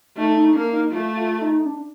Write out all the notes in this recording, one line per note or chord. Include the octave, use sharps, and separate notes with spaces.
A3 D#4
D#4
A#3 D4
D#4
A3 F4
F4
D#4
D4